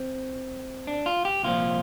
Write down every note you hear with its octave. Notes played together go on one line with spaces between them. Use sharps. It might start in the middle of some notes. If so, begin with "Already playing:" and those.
Already playing: C4
D4
F4
G4
C2 A#2 F3 F4